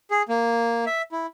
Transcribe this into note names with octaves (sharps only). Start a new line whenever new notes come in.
G#4
A#3
E5
E4